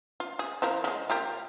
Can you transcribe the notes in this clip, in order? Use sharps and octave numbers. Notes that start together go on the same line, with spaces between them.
F4
G#4
F3 E4 A#4
C#3 G#3
F4 G4 A#4